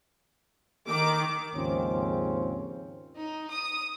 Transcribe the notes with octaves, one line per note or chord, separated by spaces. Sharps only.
D#3 D6
D#2 G#2 C#3 F3 C4 C#4
D#4
D#6